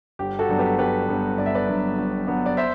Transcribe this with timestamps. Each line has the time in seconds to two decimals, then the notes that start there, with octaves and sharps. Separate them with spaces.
0.19 G1 G4
0.39 F#4 A4
0.49 G2 F#3 B3 D4
0.59 G4 B4
0.78 G1 G4 B4
1.08 G2 F#3 B3 D4
1.38 G1 D5
1.46 E5
1.55 B4 D5
1.67 G2 F#3 B3 D4
1.98 G1
2.27 G2 F#3 B3 D4
2.46 D5
2.57 C5 E5